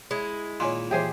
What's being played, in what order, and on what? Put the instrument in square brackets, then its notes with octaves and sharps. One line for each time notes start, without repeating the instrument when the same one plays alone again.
[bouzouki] G#3 E4
[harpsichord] A#2 D#3 A#3 [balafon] C#5 G#5 C6
[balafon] E3 C#5 E5 [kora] G4 G#4 C5